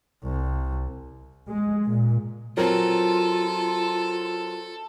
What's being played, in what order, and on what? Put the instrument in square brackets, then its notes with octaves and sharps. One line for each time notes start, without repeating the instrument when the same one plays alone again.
[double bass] C2
[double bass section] G#3
A#2
[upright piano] F#3 C4 A#4 [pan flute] F4 [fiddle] A4